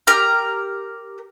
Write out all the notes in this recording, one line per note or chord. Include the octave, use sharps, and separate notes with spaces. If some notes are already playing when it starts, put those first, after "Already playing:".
G4 A#4 A#5 F6